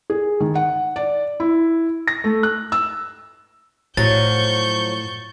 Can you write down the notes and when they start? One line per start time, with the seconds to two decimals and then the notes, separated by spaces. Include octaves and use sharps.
0.10 G#4
0.40 D#3
0.55 F#5
0.96 D5
1.40 E4
2.08 A#6
2.24 A3
2.43 F#6
2.72 E6
3.97 A2 D3 F3 F#3 C#6 G6 A6